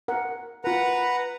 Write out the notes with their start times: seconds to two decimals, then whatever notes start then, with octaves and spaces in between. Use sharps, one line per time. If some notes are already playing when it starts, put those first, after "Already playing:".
0.08 A#4 F#5
0.64 F4 A#4 B4 F#5 A#5